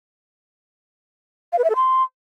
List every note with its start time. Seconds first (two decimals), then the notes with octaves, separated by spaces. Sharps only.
1.52 F5
1.58 B4
1.64 E5
1.70 A4
1.75 C6